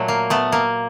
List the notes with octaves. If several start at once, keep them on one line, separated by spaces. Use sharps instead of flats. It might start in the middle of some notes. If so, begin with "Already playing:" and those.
Already playing: A#2 F#3 A3
A#3
A3 B3
A#3